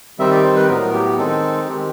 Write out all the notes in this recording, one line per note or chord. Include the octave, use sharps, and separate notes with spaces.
D#3 G3 C4 D#4 E5
D5
C5
B4
A2 F#3 B3 A#4
G4
D#3 G#3 C4 D#4 A4
D#3 G#3 C4 G4